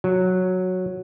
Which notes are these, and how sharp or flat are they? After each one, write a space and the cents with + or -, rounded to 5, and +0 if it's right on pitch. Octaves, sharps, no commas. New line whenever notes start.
F#3 -5